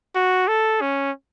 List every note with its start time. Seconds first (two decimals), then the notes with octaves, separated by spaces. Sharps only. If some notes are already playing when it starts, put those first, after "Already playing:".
0.16 F#4
0.48 A4
0.81 C#4